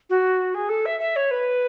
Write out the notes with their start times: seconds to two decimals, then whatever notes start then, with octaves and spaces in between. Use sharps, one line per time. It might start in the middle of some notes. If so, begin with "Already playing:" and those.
0.09 F#4
0.54 G#4
0.68 A4
0.85 E5
0.99 E5
1.15 C#5
1.30 B4